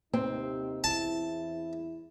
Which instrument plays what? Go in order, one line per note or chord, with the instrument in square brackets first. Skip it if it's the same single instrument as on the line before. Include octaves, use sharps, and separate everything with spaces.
[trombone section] D#2 C3 D#4 [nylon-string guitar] C4
[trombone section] E2 E4 [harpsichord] A5